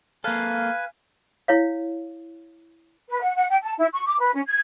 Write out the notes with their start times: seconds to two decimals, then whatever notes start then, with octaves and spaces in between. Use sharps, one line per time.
0.24 A#3 A4 B4 F5 G#5
1.48 E4 C#5 F5
3.09 B4
3.21 F#5
3.36 F#5
3.49 G5
3.62 A5
3.77 E4
3.92 C#6
4.05 D6
4.20 B4
4.34 C#4
4.46 G#6